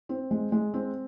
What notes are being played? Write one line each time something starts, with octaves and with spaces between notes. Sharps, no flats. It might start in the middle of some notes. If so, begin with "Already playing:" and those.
C4
G#3
G#3
C4